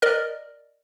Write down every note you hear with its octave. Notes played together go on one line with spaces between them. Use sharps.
A#4 D5 D#5 F6